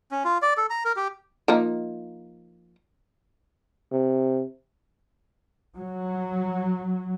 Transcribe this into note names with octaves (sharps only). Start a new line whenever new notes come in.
C#4
F4
D5
A4
A#5
A#4
G4
F3 A#3 D#4
C3
F#3